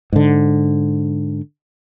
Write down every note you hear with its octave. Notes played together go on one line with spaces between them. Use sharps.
G#2 D3